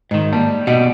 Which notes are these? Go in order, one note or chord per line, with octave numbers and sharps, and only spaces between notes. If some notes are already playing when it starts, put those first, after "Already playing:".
G#2 D#3 D#5
G3 A#3
B2 G3 D#5